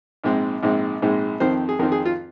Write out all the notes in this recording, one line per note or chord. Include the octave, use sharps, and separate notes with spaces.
A#1 G#2 G#3 C4
A#1 G#2 G#3 C4
A#1 G#2 G#3 C4
F2 D#3 C4 C5
G#4
F2 D#3 C4 A#4
G#4
F4